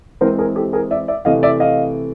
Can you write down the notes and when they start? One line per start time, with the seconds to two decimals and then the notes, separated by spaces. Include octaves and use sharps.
0.21 E3 G#3 C4 A#4 C5
0.39 G#4 A#4
0.56 G4 A4
0.73 G#4 A#4
0.91 D5 E5
1.08 D5 E5
1.25 C3 E3 A3 D#5 F5
1.43 D5 E5
1.60 D#5 F5